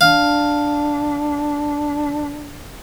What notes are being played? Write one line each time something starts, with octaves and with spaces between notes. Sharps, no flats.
D4 F5